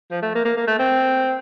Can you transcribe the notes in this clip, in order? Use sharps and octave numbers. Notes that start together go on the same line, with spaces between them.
F3
A3
A#3
A#3
A#3
A3
C4